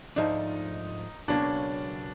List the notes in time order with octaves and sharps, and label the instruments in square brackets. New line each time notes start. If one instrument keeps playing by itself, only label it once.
[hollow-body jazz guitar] G#2 F3 A3 D4 [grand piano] D#4
[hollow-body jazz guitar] C#2 B2 F#3 A#3 C#4 [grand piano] D4